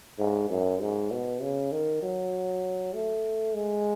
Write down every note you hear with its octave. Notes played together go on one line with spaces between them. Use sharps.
G#2
F#2
G#2
B2
C#3
D#3
F#3
A3
G#3